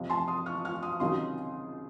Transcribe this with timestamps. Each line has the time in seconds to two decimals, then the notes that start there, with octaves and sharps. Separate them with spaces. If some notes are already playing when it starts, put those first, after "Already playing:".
Already playing: F2 C3 F3
0.10 A5 C6
0.28 C6 D#6
0.46 C#6 F6
0.65 C#6 F6
0.83 C6 D#6
1.00 C#2 C3 D#3 F#3 C6 D#6